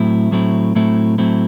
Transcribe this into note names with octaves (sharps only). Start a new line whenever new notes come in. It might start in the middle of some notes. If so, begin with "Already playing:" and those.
Already playing: A2 F#3 A3 C4 E4
A2 F#3 A3 C4 E4
A2 F#3 A3 C4 E4
A2 F#3 A3 C4 E4